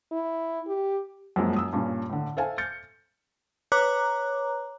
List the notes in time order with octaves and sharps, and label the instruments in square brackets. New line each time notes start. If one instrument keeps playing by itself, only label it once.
[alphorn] E4
G4
[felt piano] F#2 F3 G#3 A#3
F#2 D#6 E6
G2 A#2 C#4
A2 D3
A4 C5 E5 F5 G#5 A5
F6 G6 A6 C#7
[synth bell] B4 C#5 A#5 D6 F#6